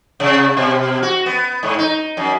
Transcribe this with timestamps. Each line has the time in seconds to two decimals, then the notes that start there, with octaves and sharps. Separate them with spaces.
0.20 C3
0.57 B2
1.03 F#4
1.26 B3
1.63 G#2
1.79 D#4
2.17 F#2